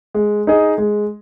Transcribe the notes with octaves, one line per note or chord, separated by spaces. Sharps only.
G#3
D#4 G#4 D#5
G#3